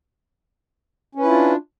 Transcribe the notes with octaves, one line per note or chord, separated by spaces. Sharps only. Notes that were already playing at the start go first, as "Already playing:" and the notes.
C#4 D4 E4 F4 B4